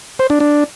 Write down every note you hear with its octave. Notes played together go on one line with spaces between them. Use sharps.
C5
D4
D4